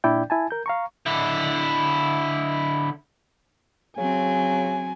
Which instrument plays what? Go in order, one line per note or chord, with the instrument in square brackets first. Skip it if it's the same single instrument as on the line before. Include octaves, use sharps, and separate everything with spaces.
[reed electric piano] A#2 D4 E4 D5 G5 G6
E4 G#5 A5
A#4 G6
F5 A#5 C#6
[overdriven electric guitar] D3 E4
[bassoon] C#3 [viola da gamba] F#3 C4 [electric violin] G#5